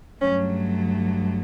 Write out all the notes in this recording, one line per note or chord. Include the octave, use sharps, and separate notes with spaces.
G2 F#3 A3 C#4